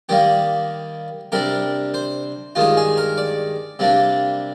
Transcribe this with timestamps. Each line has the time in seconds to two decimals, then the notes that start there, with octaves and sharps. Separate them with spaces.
0.09 D#3 G3 A#3 G4
1.32 C3 G3 D4 A#4
1.94 C5
2.55 G2 D#3 G#3 D#4 F4
2.77 G#4
2.97 A#4
3.17 D5
3.79 C3 G3 A#3 D4